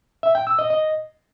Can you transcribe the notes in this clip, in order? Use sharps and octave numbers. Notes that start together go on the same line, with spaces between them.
E5
G5
E6
D#5
D#5